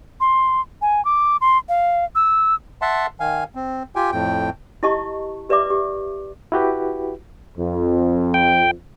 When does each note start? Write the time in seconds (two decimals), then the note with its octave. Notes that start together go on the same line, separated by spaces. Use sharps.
0.20 C6
0.82 G#5
1.05 D6
1.41 C6
1.69 F5
2.15 E6
2.82 E5 F#5 A5 C6
3.20 D#3 F5 G#5
3.55 C4
3.96 F4 G4 G5 G#5
4.12 F2 A2 G5
4.83 E4 G4 D#5 A5 C#6
5.49 G4 B4 D5 E5 D6
5.70 G4
6.52 E4 F#4 G4 B4
7.56 F2
8.34 G5